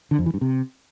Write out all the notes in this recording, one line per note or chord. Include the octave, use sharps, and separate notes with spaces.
D3
F2
E3
G2
C3